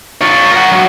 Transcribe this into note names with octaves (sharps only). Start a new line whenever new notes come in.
F4 C#5
A#4 F#5
A2 F#3